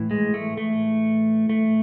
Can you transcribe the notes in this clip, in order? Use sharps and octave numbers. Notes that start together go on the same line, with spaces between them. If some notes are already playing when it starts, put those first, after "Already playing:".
Already playing: A2 E3
G#3
A3
A3
A3